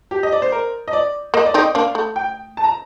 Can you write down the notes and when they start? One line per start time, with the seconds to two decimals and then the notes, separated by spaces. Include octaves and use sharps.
0.11 G4
0.23 D#5
0.32 D5
0.42 C5
0.52 A#4
0.88 D#5
0.93 D5
1.34 A#3 D#5
1.46 D5
1.54 C4 D#4 D#5
1.75 A#3 D4 F5
1.95 A3
2.16 G5
2.57 A5
2.64 A#5